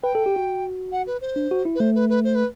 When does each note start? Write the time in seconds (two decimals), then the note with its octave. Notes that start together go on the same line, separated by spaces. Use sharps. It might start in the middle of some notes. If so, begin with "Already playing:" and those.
0.03 B4 G5
0.15 A4
0.26 G4
0.36 F#4
0.92 F#5
1.07 B4
1.21 C5
1.36 D4
1.51 F#4
1.65 E4
1.75 B4
1.80 A3 C5
1.95 B4
2.09 B4
2.24 C5
2.35 B4